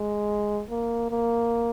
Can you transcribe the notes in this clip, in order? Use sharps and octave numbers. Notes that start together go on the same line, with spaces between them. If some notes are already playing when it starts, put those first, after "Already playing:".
Already playing: G#3
A#3
A#3